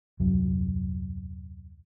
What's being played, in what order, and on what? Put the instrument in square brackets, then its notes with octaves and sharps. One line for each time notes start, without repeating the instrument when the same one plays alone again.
[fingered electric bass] D#1 C2 F#2 F#3